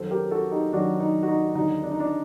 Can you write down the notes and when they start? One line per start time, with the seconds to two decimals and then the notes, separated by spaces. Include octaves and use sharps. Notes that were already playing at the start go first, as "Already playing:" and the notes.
Already playing: F#2 D#3 F#3 A4 C5
0.11 G4 A#4
0.31 F#4 A4
0.52 D#4 G4
0.73 F#2 D#3 F#3 D4 F#4
1.00 D#4
1.23 F#4
1.28 D#4
1.55 D#2 D3 F#3 D#4
1.83 D4
1.92 D#4
2.00 D4